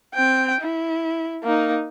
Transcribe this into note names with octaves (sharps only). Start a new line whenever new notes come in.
C4 G5
E4
A#3 D#4